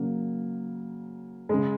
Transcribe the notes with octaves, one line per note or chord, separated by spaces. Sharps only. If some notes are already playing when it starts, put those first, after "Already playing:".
Already playing: C#3 F#3 A#3
C#3 G#3